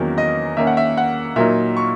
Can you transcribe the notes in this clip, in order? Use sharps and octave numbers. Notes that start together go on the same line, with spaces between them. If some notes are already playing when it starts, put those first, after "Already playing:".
Already playing: E2 D#3 F#3 A#3 C#4
D#5
D#3 A#3 C#4 E5
F#5
E5
F#5
A#2 F#3 A#3 D#4 E5
C#6